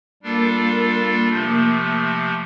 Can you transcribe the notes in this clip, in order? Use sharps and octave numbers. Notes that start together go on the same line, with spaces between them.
G3 A#3 D4 F4 A4
C3 F3 A3